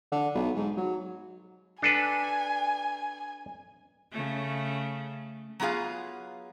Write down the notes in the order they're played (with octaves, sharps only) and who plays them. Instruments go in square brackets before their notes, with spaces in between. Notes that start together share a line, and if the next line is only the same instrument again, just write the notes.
[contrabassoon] D3
B1
G#2
F#3
[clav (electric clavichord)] D4 A4 B4 [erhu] G#5
[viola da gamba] C#3 A3
[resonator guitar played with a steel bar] F#3 B3 F4 G#4 F5